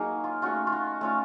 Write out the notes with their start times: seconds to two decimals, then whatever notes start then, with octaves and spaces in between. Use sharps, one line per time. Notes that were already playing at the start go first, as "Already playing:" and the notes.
Already playing: F#3 A#3 D#4 G#4
0.24 F4
0.42 A3 C#4 F4 F#4
0.67 F4
0.72 F#4
1.01 A3 C#4 F4